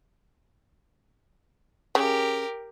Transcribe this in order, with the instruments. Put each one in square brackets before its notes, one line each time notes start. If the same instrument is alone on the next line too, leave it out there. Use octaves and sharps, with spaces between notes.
[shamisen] C#3 [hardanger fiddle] G4 A#4